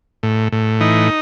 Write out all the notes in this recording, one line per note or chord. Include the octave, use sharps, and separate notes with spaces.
A2
A2
E3 D#4